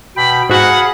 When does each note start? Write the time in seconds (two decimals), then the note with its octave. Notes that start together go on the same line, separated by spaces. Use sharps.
0.16 B2 G5 B5
0.50 G#2 F#4 G#4 F5 F#5 B5